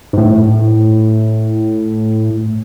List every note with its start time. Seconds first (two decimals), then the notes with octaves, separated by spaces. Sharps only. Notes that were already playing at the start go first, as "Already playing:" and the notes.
0.13 G#2
0.18 A2